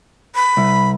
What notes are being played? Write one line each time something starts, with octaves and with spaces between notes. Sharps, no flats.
B5
C2